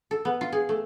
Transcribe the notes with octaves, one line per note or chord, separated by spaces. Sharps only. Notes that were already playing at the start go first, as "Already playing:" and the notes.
A4
B3
F4
G#4
A3